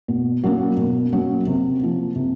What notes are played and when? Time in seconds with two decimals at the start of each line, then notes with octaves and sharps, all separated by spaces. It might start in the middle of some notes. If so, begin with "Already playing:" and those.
0.08 B2
0.43 F#3 A#3 C#4 F#4
0.77 B2
1.12 F#3 A#3 C#4 F#4
1.47 C3
1.81 F3 A#3
2.16 C3